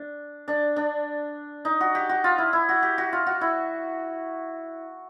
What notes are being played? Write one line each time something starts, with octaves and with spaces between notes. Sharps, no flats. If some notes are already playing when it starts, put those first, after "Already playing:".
Already playing: D4
D4
D4
D#4
F#4
G4
F#4
F4
E4
E4
F#4
G4
F#4
F4
F#4
E4